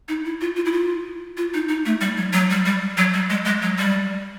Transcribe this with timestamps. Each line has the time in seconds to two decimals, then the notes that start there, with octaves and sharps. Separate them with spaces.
0.09 D#4
0.25 E4
0.41 F4
0.56 F4
0.65 E4
0.72 F4
1.37 F4
1.54 D#4
1.69 D#4
1.86 A3
2.01 G3
2.18 F#3
2.33 F#3
2.50 G3
2.66 G3
2.97 F#3
3.14 G3
3.30 G#3
3.45 G#3
3.62 F#3
3.79 G3